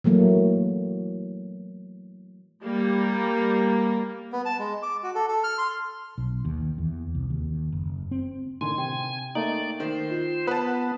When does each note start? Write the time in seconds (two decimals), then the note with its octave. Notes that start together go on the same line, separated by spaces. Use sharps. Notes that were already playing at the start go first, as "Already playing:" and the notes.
0.04 E3 F#3 A3 A#3
2.64 G3 A#3
4.33 B3
4.45 A5
4.59 G#3
4.83 D6
5.03 F#4
5.15 A4
5.28 A4
5.44 F6
5.58 C6
6.18 B1
6.45 D#2
6.78 E2
7.15 C2
7.30 D#2
7.72 F#1
8.11 C4
8.61 A2 D3 D#3 G#5 C6
8.78 C3 G5
9.35 A3 A#3 D#4 D5
9.80 D#3 C5
10.11 F4
10.47 B3 B4 F#5 A5